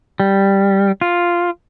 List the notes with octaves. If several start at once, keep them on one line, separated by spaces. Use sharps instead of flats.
G3
F4